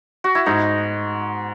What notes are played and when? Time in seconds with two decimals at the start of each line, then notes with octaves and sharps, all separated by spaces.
0.24 F#4
0.35 E4
0.46 G#2 D#4